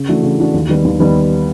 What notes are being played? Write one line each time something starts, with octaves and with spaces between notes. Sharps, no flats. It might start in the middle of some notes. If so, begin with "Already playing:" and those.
Already playing: C#3
E3 A3 D4 F#4
C#3
E3 A3 D4 F#4
D#2
D#3 G3 B3
D#2
D#3 G3 B3